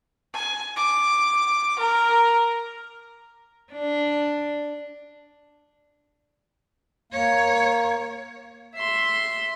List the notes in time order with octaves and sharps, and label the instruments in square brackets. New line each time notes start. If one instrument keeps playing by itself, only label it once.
[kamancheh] G#5
D6
A#4
[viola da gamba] D4
[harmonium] A#3 [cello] C#5
[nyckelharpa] E5 C6